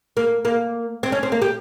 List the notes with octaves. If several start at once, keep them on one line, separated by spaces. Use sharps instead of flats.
A#3
A#3
C4
C#4
C4
A#3
G4